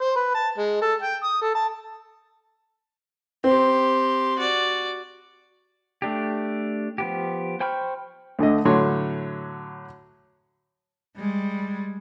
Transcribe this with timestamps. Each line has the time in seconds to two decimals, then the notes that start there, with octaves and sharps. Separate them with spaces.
0.01 C5
0.16 B4
0.34 A5
0.58 G#3
0.82 A4
1.02 G5
1.23 D#6
1.42 A4
1.55 A5
3.44 C4 G4 C6
4.38 F#4 D5
6.02 A3 D4 G4
6.98 F3 B3 G4
7.60 C5 G5 B5 C#6 F6
8.39 D2 D3 A3 D#5
8.65 A2 D3 F#3 C#5 C6
11.17 G3 G#3